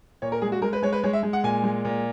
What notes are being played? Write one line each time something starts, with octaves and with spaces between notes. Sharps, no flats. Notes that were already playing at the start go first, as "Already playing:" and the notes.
A#2 C#5
A#4
G#3 G#4
F#4
G#3 A#4
B4
G#3 C#5
B4
G#3 C#5
E5
G#3
F#5
A#2 G#5
G#3
A#2